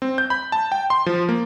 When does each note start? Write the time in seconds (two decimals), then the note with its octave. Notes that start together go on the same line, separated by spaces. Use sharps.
0.02 C4
0.18 G6
0.30 B5
0.52 A5
0.72 G5
0.90 C6
1.06 F3
1.29 A#3